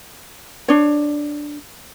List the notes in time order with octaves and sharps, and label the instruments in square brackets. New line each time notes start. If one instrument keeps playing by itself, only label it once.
[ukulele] D4 C#5